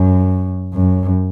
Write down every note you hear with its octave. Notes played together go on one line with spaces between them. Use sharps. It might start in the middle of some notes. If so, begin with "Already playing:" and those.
Already playing: F#2
F#2